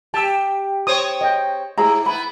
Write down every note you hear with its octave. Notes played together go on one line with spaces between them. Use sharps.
G4 A5 E6
C4 C5 C#5 D#6
D#5 G5
G#2 E4 G#4 A#5
B3 E4 B5